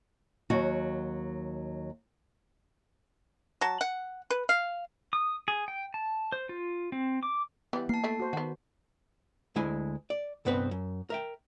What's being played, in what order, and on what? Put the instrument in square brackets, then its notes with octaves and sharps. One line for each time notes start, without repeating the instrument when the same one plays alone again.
[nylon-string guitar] D#2 F#3 F#4
[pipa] F#3 A5
F#5
B4
F5
[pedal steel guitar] D#6
G#4
G5
A5
C5
F4
C4
D6
[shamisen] E3 G3 [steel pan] B3
[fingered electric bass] A#3 [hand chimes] A5 C7
[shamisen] A3 E4
[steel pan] F#4 C5
[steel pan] D#3 [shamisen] B3 F#4
[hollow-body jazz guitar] D2 G#3 E4 G#5
D5
C2 G2 B3 C4 B4
F#2
A#4 E5 G5